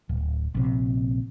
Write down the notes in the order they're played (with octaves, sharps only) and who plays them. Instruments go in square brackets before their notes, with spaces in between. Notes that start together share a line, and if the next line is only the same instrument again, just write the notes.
[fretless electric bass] D1
A#1 C3